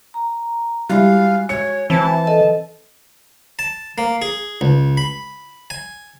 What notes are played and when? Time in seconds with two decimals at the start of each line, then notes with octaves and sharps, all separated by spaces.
0.14 A#5
0.89 G3 G#3 E4 F#4 F5
1.49 C#5 C#7
1.90 E3 C4 A5
2.27 A4 D#5
3.59 A5
3.98 A#3
4.22 G#4
4.61 C#2
4.97 B5
5.70 G#5